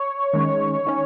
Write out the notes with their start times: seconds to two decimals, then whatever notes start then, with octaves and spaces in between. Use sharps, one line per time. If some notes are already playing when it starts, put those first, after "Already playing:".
Already playing: C#5
0.33 D#3 G#3 C#4
0.87 D#3 C#4